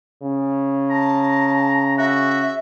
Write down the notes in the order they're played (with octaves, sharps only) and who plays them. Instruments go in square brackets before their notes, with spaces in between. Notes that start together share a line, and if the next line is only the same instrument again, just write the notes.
[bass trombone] C#3
[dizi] A5 [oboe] A#5
[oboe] F#4 [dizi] E5